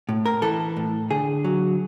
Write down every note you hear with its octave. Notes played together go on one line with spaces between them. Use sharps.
A2
A#4
E3 A4
A2
D3 G#4
F#3